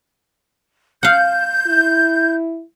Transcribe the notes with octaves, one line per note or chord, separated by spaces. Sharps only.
F5 F#5 G6
E4